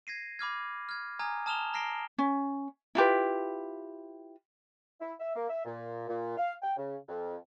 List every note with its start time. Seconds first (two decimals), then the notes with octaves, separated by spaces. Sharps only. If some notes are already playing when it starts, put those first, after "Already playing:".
0.07 G#6 A#6 C7 D#7
0.39 B5 D6 F6 G#6
0.89 F6 G#6
1.19 G#5 A#5 D#6 F6 G#6
1.46 A5 D#6 F6 E7 F7 G7
1.74 A#5 F6 A#6 C7 D7 G7
2.18 C#4
2.95 E4 F4 G4 B4
5.01 E4
5.20 E5
5.36 A#3
5.50 E5
5.65 A#2
6.08 A#2
6.37 F5
6.62 G5
6.77 C#3
7.08 F2